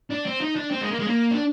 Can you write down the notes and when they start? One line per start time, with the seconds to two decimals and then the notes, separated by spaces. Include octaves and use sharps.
0.10 D4
0.26 C4
0.41 D#4
0.56 D4
0.71 C4
0.81 G#3
0.91 A#3
0.99 G#3
1.07 A#3
1.31 D4